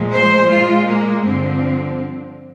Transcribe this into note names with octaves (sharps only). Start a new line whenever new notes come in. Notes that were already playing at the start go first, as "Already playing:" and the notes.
Already playing: A#2 F3 G#3
C5
A#2 G#3 F4
A#3
G2 D3 F3 C4